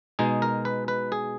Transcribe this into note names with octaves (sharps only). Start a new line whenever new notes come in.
B2 G#3 D#4 G#4
A#4
B4
B4
G#4